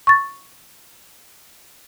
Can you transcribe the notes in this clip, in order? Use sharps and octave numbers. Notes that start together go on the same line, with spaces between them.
C#6 A6